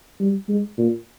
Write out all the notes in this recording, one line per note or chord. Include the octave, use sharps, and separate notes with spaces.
G3
G#3
A#2